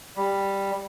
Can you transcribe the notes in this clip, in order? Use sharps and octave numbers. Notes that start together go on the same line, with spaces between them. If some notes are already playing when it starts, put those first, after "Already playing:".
G3